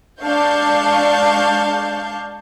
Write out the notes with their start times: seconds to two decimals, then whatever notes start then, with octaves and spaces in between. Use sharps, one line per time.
0.22 G#3 D4 F5 A5 C#6 G6